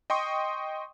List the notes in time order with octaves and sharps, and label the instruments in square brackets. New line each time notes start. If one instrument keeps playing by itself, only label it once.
[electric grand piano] D#5 G5 C6 C#6 D#6